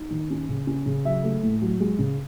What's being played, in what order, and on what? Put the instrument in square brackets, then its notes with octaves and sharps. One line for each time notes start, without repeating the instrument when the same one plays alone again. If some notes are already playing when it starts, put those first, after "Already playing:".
Already playing: [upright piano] D#4
D#3
C#4
C#3
C#4
C#3
F#3 E5
A3
A2
F#3
G#3
C#3